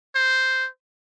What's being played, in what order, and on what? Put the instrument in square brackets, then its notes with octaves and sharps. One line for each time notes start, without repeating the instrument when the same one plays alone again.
[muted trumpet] C5